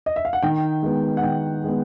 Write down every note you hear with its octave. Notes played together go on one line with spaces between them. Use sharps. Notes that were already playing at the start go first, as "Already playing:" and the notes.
D#5
E5
F5
F#5
D#3 G5
G#3 B3
F#5
D#3 G5
G#3 B3